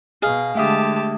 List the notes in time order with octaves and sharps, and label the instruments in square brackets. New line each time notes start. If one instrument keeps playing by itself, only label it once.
[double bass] B2 [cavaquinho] G#4 D#5 F5
[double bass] D3 G#3 [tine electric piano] A3 E5 D#6 [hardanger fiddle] G4 A5